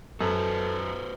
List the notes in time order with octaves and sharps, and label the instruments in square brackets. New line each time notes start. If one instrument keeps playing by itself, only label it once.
[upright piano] F#2 [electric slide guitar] F#4 B4 C5 [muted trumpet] A4